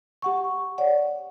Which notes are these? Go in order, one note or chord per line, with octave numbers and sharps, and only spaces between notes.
G4 F#5 C#6
C#5 D5 F#5